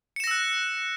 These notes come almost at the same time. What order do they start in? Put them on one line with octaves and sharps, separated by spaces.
C#7 E7 A#6 E6 F#6